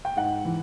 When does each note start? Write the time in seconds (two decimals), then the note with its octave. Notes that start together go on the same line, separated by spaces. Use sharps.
0.05 G5
0.17 G#2 F#5
0.45 E3